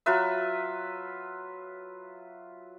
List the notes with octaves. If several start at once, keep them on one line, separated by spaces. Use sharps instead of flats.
F#3 F4 B4 E5